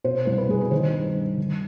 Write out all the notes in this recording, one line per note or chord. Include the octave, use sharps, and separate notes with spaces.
B2 C5
C2 C5
B4
C2 G#4
B4
D#3 C5
G2
G2
D#3